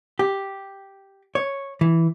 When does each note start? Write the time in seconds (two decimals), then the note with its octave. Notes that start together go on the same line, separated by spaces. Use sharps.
0.19 G4
1.35 C#5
1.81 E3